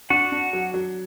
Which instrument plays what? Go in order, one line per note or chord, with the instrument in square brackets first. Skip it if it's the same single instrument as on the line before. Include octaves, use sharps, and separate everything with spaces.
[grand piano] D4 [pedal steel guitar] F#4 F#5
[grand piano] D4
F#3
F#3